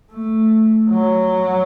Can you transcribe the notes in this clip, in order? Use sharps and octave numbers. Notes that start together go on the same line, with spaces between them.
A3
F#3